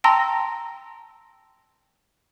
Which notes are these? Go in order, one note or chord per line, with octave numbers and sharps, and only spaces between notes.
G5 A5 A#5 C6 E6 A#6